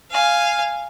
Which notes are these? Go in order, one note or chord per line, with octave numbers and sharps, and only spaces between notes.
F5 G#5